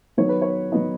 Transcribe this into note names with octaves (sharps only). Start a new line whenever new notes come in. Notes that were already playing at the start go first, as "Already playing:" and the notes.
D#3 F#3 B3 D#4 C#5
B4
C#5
D#3 F#3 B3 D#4 D#5